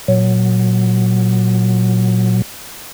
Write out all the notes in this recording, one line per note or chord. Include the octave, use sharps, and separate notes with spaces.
A#2 F#3